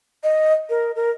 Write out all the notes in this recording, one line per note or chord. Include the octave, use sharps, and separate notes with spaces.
D#5
A#4
A#4